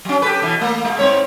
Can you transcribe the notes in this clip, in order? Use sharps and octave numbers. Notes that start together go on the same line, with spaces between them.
F#3 C#4
G4 A4 B4
B2 E3
A3 A#3
B2 G#3
G#2 C4 C#5